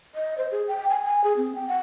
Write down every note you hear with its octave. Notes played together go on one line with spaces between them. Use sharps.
D#5
C5
G#4
G5
G#5
G#5
G#4
C4
G5
F#5